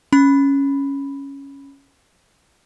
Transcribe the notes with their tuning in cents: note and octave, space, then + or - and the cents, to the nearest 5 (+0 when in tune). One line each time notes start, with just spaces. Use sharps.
C#4 +0 B5 +0